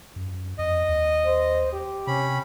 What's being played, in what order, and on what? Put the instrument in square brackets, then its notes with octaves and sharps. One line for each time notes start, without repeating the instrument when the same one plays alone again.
[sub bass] F#2
[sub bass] F2 [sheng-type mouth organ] D#5
[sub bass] D#2
[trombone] C5
G4
[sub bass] C3 [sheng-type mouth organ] C#4 B5